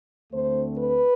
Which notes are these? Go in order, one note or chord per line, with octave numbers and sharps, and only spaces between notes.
D2 D3 A3 C4 C5
B4